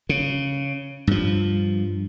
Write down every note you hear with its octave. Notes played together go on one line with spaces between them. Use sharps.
C#3
G2 F3